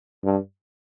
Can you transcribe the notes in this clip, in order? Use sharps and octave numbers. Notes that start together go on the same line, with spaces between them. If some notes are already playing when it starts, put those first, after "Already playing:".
G2